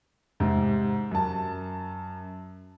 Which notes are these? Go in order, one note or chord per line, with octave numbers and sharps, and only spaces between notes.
G#2 C3
F#2 A5